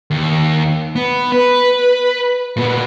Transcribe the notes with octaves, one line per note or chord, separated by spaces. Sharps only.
D#2
B3
B4
A#2 B3